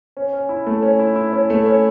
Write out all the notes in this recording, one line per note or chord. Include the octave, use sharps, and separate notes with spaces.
C#4
C#4
E4
A3
C#4
E4
E4
C#4
A3
C#4